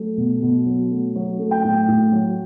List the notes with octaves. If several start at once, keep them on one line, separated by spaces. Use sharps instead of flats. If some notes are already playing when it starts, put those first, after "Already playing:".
Already playing: F#3 A3
B2
B2
F#3
A3
F#3
A3
G5
A2
A2
F#3